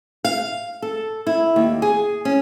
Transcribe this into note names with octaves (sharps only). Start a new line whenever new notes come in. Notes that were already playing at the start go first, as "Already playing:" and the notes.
F5
A4
E4
D#2
G#4
C#4